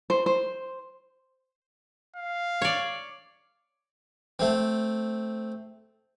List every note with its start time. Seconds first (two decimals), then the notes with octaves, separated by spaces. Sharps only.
0.10 C5
0.26 C5
2.16 F5
2.62 C#5 D5
4.39 A3 C4